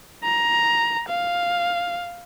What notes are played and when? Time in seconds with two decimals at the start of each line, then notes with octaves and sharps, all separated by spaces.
0.24 A#5
1.09 F5